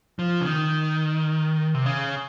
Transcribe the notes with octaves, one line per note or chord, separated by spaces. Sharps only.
F3
C#3
D#3
C3
C#3